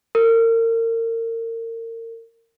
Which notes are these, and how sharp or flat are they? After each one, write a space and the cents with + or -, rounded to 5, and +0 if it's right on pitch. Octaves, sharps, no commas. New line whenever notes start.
A#4 -35